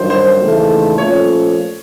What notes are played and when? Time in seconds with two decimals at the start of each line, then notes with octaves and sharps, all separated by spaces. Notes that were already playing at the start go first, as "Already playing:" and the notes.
Already playing: G2 D#3 F#3 C5
0.10 C5
0.39 D#2 C#3 E3 A3
0.98 A#2 F3 A3 C#4 C#5